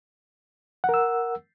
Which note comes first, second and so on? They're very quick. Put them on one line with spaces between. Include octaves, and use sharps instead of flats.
F#5 A#4 E6